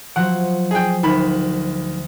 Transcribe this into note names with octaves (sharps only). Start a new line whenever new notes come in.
F3 F#3 C5 F#5
G#4 G5
D2 D#3 B5